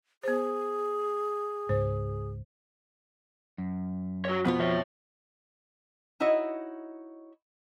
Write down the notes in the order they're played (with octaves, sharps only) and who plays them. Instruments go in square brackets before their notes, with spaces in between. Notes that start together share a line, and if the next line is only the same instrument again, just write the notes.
[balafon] B3 C5 [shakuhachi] G#4
[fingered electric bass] C#2 G#2 [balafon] C5
[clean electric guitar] F#2
[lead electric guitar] F#4 C#5
[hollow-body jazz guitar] F2 B2 F4 [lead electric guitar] B3
[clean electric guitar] F3 [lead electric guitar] C#5 E5
[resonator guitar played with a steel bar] D#4 E4 F#4 C#5 D#5